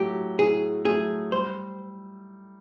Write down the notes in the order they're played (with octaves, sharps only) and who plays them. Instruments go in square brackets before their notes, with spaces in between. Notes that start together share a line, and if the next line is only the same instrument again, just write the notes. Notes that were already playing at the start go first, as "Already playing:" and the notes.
Already playing: [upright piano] A2 F#3 A3 [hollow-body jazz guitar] G4
[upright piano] A2 [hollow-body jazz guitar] G#4
[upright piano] F#3 A3 [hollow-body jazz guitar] G#4
[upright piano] G3 [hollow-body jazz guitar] C5